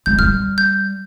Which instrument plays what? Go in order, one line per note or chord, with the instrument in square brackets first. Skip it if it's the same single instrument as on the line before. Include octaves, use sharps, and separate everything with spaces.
[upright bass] G#3 [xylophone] G6
[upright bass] G3 [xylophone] F6
[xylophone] G6